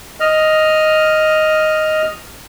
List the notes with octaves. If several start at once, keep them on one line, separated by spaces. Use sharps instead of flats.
D#5 F6